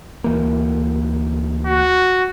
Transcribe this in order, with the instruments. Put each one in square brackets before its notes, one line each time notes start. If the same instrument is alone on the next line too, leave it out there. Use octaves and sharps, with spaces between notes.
[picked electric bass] D2 E3 A#3
[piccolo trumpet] F#4